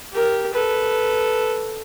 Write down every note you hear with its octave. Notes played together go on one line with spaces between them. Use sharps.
G4 A#4
A4 B4